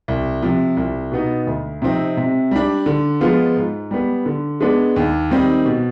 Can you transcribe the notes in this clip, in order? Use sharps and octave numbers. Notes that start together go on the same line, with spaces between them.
C2
C3 F3
C2
B2 B3 D#4
D2
C3 F3 C4 D#4
C3
G3 D4
D3
F3 G#3 B3 F4
G#2
G3 B3
D3
G#3 B3 D4
D#2
D#3 G3 C4 D#4
B2